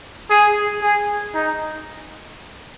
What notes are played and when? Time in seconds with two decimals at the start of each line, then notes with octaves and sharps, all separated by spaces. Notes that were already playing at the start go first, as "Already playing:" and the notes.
0.30 G#4
0.82 G#4
1.34 D#4